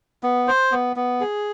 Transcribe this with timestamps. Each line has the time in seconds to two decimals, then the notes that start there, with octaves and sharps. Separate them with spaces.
0.23 B3
0.48 C5
0.72 B3
0.96 B3
1.21 G#4